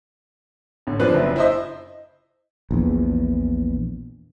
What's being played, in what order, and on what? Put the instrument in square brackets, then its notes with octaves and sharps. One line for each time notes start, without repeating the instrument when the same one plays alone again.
[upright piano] A1 D3
F#2 F3 C4 D4 B4 F#6
F#1 E5
E4 C5 D#5
[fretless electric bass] A#1 E2